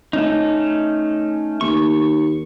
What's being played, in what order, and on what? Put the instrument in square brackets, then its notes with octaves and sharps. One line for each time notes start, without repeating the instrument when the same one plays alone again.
[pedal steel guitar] A3 C#4 D#4
[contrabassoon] D#2 [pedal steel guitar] C#6